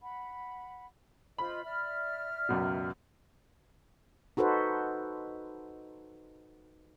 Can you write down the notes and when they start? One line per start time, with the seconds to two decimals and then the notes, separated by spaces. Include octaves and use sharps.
0.02 F#5 B5
1.38 F4 C5 D#5 B5
1.64 D5 E5 F6
2.49 C#2 F#2 B2
4.37 D#4 F#4 A4 B4 C5